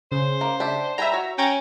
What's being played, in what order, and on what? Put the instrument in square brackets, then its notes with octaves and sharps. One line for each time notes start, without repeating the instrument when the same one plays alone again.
[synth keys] C#3 [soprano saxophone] C5
[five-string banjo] A#3
D4 G4 E5
[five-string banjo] G3 G5 G#5 [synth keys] E5 A#5
[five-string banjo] F#4 C#5
[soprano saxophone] C#4 [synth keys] G5 A#5